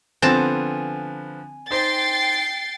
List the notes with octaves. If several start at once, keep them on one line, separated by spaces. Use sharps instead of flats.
D3 F3 B3 C4 G#5 A5
D#4 C5 G5 A6 C7